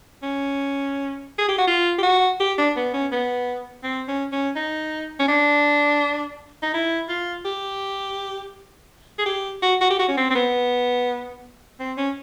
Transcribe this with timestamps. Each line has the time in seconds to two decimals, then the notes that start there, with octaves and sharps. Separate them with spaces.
0.23 C#4
1.38 G#4
1.48 G4
1.58 F#4
1.67 F4
1.99 G4
2.03 F#4
2.40 G4
2.58 D4
2.76 B3
2.94 C#4
3.12 B3
3.84 C4
4.08 C#4
4.32 C#4
4.56 D#4
5.19 C#4
5.28 D4
6.63 D#4
6.74 E4
7.09 F4
7.45 G4
9.19 G#4
9.26 G4
9.63 F#4
9.81 F#4
9.90 G4
9.99 F#4
10.08 C#4
10.17 C4
10.30 C4
10.35 B3
11.80 C4
11.97 C#4